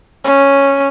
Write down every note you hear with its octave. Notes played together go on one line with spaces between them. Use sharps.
C#4